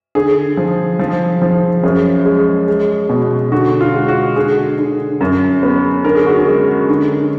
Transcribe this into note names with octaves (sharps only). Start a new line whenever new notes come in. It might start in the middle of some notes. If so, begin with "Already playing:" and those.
D3 G#4
F3
F3
F3
F#2 G#4
G#3
G#3
B2
D3 F#4
F4
G#3
F#4
D3 G#4
D3
F#2
B3
D3 A#4
G#4
F#4
G#4
G#3
D3